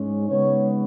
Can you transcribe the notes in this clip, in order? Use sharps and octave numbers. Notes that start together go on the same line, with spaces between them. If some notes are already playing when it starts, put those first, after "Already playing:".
Already playing: G#2 G#3 C#4
C#3 G#3 B3 D#4 C#5